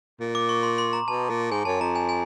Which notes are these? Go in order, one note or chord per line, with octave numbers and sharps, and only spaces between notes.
A#2
D6
C#6
C6
C6
A#5
B2 A5
A#2
G#2 G#5
F#2 A5
F2 A#5
G#5
G#5